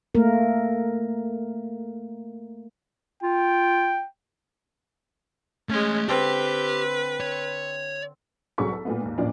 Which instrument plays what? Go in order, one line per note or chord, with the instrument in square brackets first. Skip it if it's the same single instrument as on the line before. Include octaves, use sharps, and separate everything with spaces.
[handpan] A3 A#3 A#4
[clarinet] F4 [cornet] G5
[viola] G#3 C#4 [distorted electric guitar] A3 C6
[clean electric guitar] D3 C4 [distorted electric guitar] G4 [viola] B4
[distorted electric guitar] C#5
[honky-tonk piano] C2 F#3 G#4 A4 C#6 B6
A4
A#2 A3 B3
D#2 G#2
A1 A#2 F3 D4